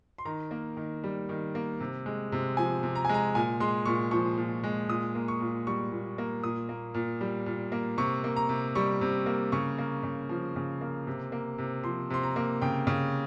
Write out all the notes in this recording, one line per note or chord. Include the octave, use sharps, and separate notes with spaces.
C6
D#3 A#5
A#3
D#3
G3
D#3
A#3
C3
G#3
C3
F3 G#5
C3
A#5
G#5
G#3 A#5
A#2 G#5
G#3 C6
A#2 C#6
F3 C#6
A#2
G#3
A#2 D#6
A#3
C#6
A#2
G3 C#6
A#2
A#3
A#2 D#6
A#3
A#2
G3
A#2
A#3
C3 C#6
A#3
A#5
C3
G3 C#6
C3
A#3
C#3 C#6
A#3
C#3
F3
C#3
A#3
C3
A#3
C3
F3 C6
C3 C6
A#5
A#3
C#3 G5
C#3